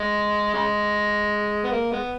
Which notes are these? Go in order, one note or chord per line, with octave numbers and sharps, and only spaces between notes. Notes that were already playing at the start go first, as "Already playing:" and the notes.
Already playing: G#3
C#3 G#3
B3
A#3
G#3 B3